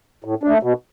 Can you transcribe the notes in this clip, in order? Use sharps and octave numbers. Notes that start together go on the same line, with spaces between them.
A2
A3 D4
B2